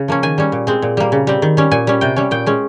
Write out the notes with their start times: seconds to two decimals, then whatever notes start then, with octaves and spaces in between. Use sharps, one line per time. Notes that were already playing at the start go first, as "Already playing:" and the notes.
Already playing: C#3
0.08 F3 A#3 C#4
0.23 D#3 G#5
0.38 G3 C#4
0.52 A#2
0.67 G#3 C4
0.82 A#2
0.97 G3 A#3
1.12 C#3
1.27 G3 C4
1.42 D#3
1.57 G3 C#4
1.71 A#2 G#5
1.87 G3 C#4
2.01 C3 G5
2.16 G3 C#4
2.31 A#2 G5
2.46 G#3 C#4